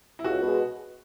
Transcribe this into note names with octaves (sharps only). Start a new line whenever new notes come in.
E4
C#2 F#4
B2
G#3